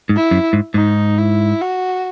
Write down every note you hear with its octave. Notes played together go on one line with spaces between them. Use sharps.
G#2
E4
F#2
G#2
G#2 D#4
E4
F#4